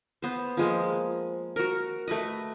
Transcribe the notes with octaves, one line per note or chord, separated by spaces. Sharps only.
B3 C5
F3 G#3 A#3
F#4 A#4
A3 B4 D#5